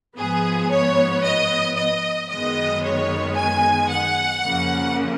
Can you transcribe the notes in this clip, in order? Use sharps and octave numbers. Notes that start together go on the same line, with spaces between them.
G#2 F3 B3 G#4
C#5
D#5
D#5
F#2 D#3 G#3 B3 D#5
C#5
G#5
F#5
F2 C#3 F3 A#3